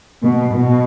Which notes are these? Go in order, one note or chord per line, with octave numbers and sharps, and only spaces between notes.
B2
B2